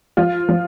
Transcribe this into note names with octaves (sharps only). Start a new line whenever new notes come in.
F3 F4
F3